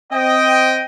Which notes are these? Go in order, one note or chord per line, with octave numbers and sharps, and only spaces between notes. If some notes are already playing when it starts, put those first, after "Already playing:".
C4 D#5 G5